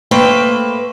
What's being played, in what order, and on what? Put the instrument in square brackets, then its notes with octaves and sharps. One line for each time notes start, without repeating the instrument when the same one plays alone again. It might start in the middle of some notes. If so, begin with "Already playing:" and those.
[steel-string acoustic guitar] A3 A#3 B4 C5 G5